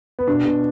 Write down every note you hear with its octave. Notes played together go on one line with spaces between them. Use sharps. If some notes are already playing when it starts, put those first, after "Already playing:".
B3
B2 D4
B2